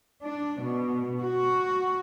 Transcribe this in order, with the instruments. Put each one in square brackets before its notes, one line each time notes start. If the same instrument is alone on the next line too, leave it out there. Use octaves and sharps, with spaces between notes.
[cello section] D4
B2
F#4